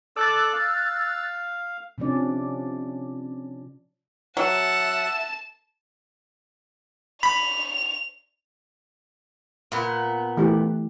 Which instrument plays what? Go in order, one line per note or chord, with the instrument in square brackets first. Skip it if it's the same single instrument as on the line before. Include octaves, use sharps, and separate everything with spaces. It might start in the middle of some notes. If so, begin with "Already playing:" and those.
[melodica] A4 D5 D6 [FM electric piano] E6 F#6 A6
[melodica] F5
[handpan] C3 F3 C#4 D4 D5
[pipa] F#3 [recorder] E5 [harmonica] F#5 [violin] A5 E7
[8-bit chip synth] B5 [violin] F7
[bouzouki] A#2 B3
[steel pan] E3 A3 G4